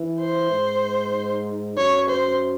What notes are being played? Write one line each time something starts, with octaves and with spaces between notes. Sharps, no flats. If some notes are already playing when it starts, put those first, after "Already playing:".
Already playing: E3
C5
G#2
F#2 C#5
C5